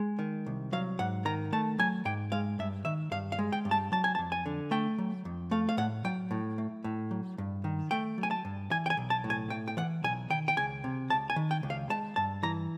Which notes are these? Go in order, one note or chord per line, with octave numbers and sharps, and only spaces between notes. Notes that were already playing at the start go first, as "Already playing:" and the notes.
Already playing: G#3
D#3
C2
F#3 F5
G#2 F#5
D#3 A#5
A3 A5
F#3 G#5
G#2 G5
G#3 F5
G2 E5
D#3 E5
G2 F5
F5
G#3
G5
G2
A5
F#3 A5
G#5
A5
F2
G#5
D3
A3 G5
F#3
F2
A3 F5
F5
A2 F#5
F#3 G5
A2
A3
A2
F#3
G2
D#3
A3 G5
F#3
G#5
A5
G2
E3 G#5
G5
G#5
B1
A5
A2
G#5
A3 G5
G5
E3 F#5
B1 G#5
D#3 G5
G5
C#2 G#5
C3
C#2 A5
G#5
D#3
G5
C#2
F5
G#3 A5
G2 A5
E3 A#5